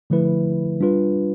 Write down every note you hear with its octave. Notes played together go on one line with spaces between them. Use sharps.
D3 F3 A3 E4 B4
G3 D4 F4 B4